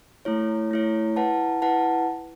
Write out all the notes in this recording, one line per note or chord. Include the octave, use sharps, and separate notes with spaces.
A3 E4 C#5
A3 E4 C#5
E4 B4 F#5 A5
E4 B4 F#5 A5